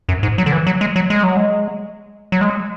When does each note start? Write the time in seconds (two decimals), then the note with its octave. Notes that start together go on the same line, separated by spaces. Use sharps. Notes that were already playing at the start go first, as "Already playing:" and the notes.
0.09 F#2
0.23 G#2
0.38 F#3
0.46 D3
0.52 E3
0.67 F#3
0.81 G#3
0.96 F#3
1.10 G#3
1.23 F#3
1.37 G#3
2.32 F#3
2.41 G#3